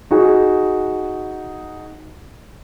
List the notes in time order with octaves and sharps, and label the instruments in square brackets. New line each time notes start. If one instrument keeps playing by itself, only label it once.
[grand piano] D#4 F#4 G#4